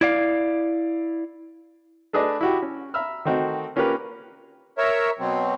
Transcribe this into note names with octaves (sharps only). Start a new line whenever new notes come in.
E4 D5 F5
A3 D4 G#4 B4 D5 D#5
E4 F#4 G4
C#4
E5 A#5 B5 E6 F6
D#3 A3 C4 D#4 F#4
A#3 C#4 F4 G4 A#4 B4
A#4 C#5 E5
B2 F#3 C4